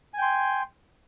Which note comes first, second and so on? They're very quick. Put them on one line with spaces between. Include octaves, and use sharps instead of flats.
G#5 G5 C6